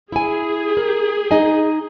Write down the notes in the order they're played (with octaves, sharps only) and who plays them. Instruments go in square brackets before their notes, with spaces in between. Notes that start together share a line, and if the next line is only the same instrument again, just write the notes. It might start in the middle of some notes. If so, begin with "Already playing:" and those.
[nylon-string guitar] E4 G#5 [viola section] G#4
[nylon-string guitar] A#4
D#4 D#5 G#5